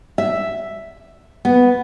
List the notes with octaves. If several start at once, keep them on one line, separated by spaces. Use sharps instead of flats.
E5
B3